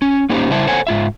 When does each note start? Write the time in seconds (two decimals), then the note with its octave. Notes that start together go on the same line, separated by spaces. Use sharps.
0.02 C#4
0.29 A#3 C#4 D#4 G4 C5
0.50 C#3 G3 E4 C5 E5 A5
0.67 A4 C5 C#5 F#5 G#5
0.87 G#2 F4 E5